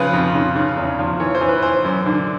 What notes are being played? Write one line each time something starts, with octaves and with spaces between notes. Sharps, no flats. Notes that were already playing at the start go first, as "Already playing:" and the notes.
Already playing: C#3 F3 B4
F2
C#3
C#3
E2
F3
E3 C#5
C5
E3
B4
E3 C5
F#2
D3